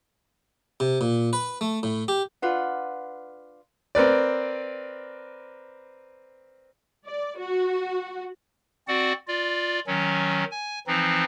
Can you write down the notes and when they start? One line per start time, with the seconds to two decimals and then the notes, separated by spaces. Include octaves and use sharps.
0.80 C3
1.01 A#2
1.33 B4
1.61 A3
1.83 A2
2.08 G4
2.42 D4 F4 B4 F#5
3.95 C4 A#4 B4 D5
7.05 D5
7.38 F#4
8.88 C4 F#4 D5 F#5
9.28 F4 D5
9.87 D#3 F#3 C#4
10.51 G#5
10.87 E3 F3 C4 D#4